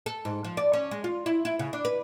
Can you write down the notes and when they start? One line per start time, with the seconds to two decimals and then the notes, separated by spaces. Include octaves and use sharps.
0.06 A4
0.25 G#2
0.44 F3
0.57 D5
0.73 C#4
0.91 G#3
1.04 F4
1.26 E4
1.45 E4
1.59 C#3
1.73 D4
1.85 B4